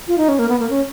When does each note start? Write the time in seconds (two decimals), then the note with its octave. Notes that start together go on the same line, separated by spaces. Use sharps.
0.08 F4
0.18 D#4
0.29 C#4
0.39 A#3
0.49 B3
0.60 A#3
0.70 C#4